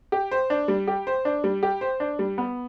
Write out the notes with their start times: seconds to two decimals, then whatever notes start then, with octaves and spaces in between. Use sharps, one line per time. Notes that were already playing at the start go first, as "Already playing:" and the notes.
0.12 G4
0.31 C5
0.50 D4
0.68 G3
0.87 G4
1.07 C5
1.25 D4
1.44 G3
1.63 G4
1.81 C5
2.00 D4
2.19 G3
2.38 B3